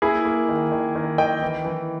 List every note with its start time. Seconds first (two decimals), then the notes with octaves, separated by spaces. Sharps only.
0.02 A#3 E4 G#4
0.25 A#3
0.49 D#3
0.72 D#3
0.95 D#3
1.18 D#3 D#5 G5
1.42 E3
1.65 E3